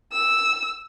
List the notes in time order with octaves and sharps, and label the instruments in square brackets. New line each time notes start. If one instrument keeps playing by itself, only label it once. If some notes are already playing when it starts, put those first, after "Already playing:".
[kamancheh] E6